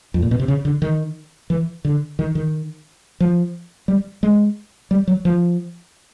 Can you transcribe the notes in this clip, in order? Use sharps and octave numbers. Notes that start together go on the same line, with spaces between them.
F2
A#2
B2
C3
C#3
D3
D#3
E3
D3
D#3
D#3
F3
G3
G#3
G3
F#3
F3